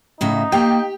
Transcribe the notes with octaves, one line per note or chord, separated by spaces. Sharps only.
A2 C#3 D#4 E5
A#3 G4 G5